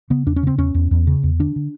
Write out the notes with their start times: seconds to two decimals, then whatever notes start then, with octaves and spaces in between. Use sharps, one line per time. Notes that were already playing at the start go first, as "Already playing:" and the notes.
0.10 C#3 B3
0.26 E2 D4
0.36 C#4
0.43 C#3 C4
0.58 E2 C#4
0.74 E2
0.91 E2
1.07 C#3
1.23 E2
1.39 D3 D4
1.56 D3